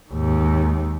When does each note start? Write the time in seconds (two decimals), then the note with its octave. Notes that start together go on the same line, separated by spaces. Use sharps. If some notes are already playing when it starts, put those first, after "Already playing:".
0.10 D#2 G#2